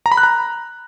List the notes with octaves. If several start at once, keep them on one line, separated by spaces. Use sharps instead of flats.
A#5
B5
F#6
A#5